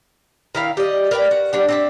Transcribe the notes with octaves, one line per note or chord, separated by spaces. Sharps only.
D#3 E4 F5
G4 D5 D#5
A#4 B4 D5 G5
F#4
G3 D4 F#5
C4 D4 E5